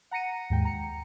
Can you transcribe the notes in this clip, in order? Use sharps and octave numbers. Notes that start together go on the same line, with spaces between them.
F#5 A#5 A#6 C#7 D#7
D#2 G#2 G5
A#5 C#7